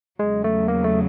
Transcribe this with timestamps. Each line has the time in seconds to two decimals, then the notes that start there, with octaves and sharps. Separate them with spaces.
0.19 E2 C#3 F#3 G#3
0.44 A3
0.68 A#3
0.84 A3